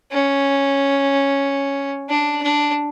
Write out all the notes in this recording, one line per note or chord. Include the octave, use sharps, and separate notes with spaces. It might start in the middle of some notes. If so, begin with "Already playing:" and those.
C#4
D4
D4